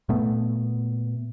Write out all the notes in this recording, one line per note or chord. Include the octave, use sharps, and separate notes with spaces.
A#2 A3 B3